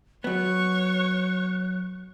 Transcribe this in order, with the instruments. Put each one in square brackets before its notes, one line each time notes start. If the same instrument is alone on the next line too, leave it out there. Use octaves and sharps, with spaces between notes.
[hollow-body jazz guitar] F#3 B3 [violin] C#5 C#6 [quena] F#6